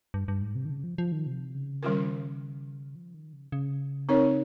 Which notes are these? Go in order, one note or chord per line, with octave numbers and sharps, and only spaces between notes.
G2
G2
G#2
C3
D#3
C#3
F3
F3
D#3
C3
C#3
D#3 G3 C#4 F4 A#4
F3
D#3
C#3
C#3
C4 D#4 A#4 C#5